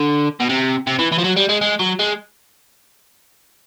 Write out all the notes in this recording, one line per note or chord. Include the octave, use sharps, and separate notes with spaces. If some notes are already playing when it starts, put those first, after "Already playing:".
Already playing: D3
B2
C3
C3
E3
E3
F3
F#3
G3
G#3
G#3
F#3
G#3